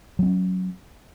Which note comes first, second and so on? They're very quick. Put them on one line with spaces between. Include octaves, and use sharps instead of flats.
F#3 C4 C#4